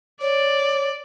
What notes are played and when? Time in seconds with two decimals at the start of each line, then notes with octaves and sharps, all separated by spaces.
0.22 C#5 D5